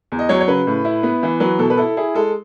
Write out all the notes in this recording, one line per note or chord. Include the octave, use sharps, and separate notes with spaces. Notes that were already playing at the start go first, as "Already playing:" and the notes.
E2
D#5
F#3 C#5
C#5
C#3 B4
A2
E4
B3
E3
F#3 B4
B2 A4
B4
E4 A4
E4 G#4
G#3 A4